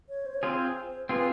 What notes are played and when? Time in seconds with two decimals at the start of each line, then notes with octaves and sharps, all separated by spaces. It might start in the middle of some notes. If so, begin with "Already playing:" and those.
0.09 C#5
0.26 C5
0.34 C#5
0.42 C4 F4 G#4 C5
1.09 C4 F4 G#4 B4